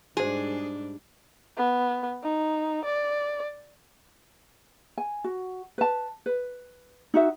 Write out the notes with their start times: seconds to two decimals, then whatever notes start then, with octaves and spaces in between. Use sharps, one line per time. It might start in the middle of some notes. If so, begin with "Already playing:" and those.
0.17 G#2 G3 D4 F#4 G#4 C5
1.57 B3
2.23 D#4
2.85 D5
4.98 G#5
5.24 F#4
5.78 B4 A5
6.26 B4
7.14 D#4 F#4 E5